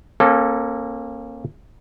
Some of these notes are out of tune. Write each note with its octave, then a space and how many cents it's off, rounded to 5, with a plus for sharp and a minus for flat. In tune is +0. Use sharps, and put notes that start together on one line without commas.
A#3 +5 C#4 -40 A4 +0